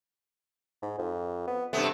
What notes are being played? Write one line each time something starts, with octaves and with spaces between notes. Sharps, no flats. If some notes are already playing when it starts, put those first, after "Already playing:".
G#2
F2
B3
G2 C3 A3 B3